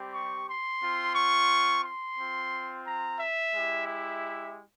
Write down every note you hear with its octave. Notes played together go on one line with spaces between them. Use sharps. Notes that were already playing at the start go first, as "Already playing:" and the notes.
Already playing: G3 C4 G4
C#6
C6
C4 F4
C#6
C6
C4 F4
A#5
E5
G#3 E4 G4
E5